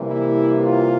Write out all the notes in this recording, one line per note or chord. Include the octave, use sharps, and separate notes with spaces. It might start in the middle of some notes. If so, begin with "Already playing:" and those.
Already playing: C3 E3 G3 A#3
E4
F4